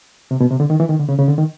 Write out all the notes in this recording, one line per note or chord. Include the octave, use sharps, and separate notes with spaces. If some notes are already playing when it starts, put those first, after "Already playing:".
C3
B2
C3
D3
D#3
E3
D#3
D3
C#3
C#3
D3
D#3